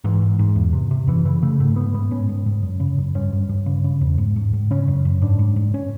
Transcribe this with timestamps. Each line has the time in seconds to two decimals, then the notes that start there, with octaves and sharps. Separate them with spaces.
0.04 G#2 E3
0.22 G#2
0.39 G#2
0.55 E2
0.73 C3
0.91 C3
1.07 F#2 E3
1.25 C#3 E3
1.42 C#3 A3
1.60 G#2 A3
1.76 G#2 B3
1.94 G#2 B3
2.11 G#2 C#4
2.29 G#2
2.46 G#2
2.63 F#2
2.80 C#3
2.98 F#2
3.15 G2 C#4
3.33 G2
3.49 G2
3.66 C#3
3.84 C#3
4.01 E2
4.18 G#2
4.36 G#2
4.53 G#2
4.71 C#3 C#4
4.88 F#2
5.05 F#2
5.22 G#2 D4
5.39 G#2
5.56 G#2
5.74 C#4